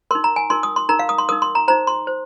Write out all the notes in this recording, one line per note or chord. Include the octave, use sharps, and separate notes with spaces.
D#4 A#4 C6
A#5
G#5
D#4 A#4 C6
D#6
C6
D#4 A#4 A#5
F5
D#6
C6
D#4 A#4 D#6
C6
A#5
D#4 C5 A#5
C6
C5